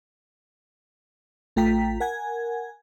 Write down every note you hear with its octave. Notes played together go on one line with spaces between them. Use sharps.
A1 A3 F4 G5 A#5 B6
A#4 F#5 G#5 G#6